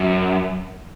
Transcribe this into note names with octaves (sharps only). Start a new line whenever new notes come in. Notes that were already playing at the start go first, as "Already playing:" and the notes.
Already playing: F#2